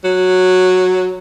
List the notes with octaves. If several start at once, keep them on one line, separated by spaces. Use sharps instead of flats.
F#3